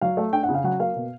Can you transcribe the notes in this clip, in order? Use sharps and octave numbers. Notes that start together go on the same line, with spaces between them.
F#3 F5
A3
D4 G5
F#5
C#3
F5
F#3 F#5
A#3 F5
B2